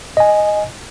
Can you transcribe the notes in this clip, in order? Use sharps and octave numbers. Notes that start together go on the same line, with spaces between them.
D#5 G#5